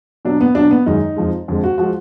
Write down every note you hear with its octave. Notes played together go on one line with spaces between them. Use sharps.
B2 F#3 D4
B3
B2 F#3 D4
B3
F#2 D#3 G#3 D#4
F2 F3 G#3
F2 D3 G#3
F#4
F3 G#3 F#4